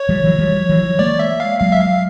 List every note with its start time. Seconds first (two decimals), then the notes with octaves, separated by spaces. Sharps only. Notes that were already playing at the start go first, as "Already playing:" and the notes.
Already playing: C#5
0.09 F3 G3
0.24 E3 F#3
0.39 F3 G3
0.69 E3 F#3
0.99 G#3 A#3 D5
1.19 E5
1.40 F5
1.60 F#3 G#3 F5
1.72 E5
1.81 F5